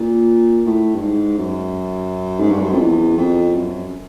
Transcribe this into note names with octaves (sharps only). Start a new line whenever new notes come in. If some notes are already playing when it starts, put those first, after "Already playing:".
Already playing: A#2
A2
G2
G#2
F#2
G#2
G2
F#2
F2
E2
F2
F#2